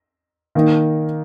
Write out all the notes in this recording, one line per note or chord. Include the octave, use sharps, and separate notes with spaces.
D#3 A#3 D#4